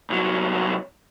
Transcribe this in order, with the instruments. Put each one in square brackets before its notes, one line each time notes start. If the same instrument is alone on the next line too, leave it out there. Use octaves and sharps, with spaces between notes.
[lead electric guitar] C2 F#3